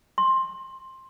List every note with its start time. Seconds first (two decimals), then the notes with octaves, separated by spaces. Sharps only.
0.18 C6